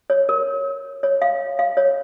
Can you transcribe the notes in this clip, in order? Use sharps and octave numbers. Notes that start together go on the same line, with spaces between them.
C#5
A#4
C#5
F5
F5
C#5